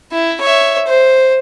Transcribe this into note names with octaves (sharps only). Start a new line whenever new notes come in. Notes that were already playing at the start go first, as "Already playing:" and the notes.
E4
C#5 E5
C5